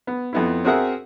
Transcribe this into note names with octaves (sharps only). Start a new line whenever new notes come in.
B3
F2 B3 E4
C4 F#4 G#4 A#4 E5 F#5